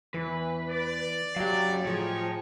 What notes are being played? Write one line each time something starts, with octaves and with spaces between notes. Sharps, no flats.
E2 E3 B4
D5
F#2 F#3 D4 G4 F5
A2 F3 D#4 G#4 C#5 G5